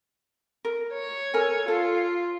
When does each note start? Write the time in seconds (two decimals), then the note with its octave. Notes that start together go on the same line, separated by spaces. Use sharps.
0.65 A#4
0.94 C#5
1.34 A4 A#4 G#5
1.68 F4 A4